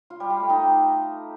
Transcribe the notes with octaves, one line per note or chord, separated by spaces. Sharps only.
F4
G3
G4
A3
D#4